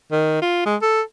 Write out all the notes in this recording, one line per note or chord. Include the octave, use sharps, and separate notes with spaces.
D#3
F4
G#3
A4